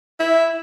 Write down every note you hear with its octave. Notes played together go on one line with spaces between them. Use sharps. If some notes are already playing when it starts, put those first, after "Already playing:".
E4